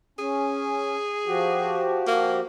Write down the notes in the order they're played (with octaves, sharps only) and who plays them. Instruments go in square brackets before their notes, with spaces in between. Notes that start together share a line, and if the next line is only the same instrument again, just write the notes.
[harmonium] C#4 [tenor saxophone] G#4
[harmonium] F3 F#4 G4
[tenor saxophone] A#3